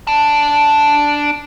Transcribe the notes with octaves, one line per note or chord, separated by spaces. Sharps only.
D4 A5